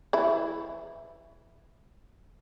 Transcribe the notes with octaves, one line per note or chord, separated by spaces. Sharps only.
E3 E4